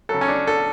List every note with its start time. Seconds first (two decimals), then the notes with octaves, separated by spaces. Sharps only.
0.09 C#3 F#3 A4
0.21 C#4
0.28 D4
0.47 A4